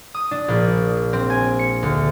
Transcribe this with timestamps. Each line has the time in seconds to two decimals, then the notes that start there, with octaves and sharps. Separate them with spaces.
0.14 D#6
0.31 D4
0.48 A#1
1.13 C4
1.30 G#5
1.59 C#7
1.83 D2